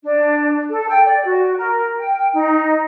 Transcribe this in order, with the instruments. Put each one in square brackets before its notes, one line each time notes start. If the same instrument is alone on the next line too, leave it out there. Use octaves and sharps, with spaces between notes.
[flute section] D4
A4
G5
D5
F#4
A#4
G5
D#4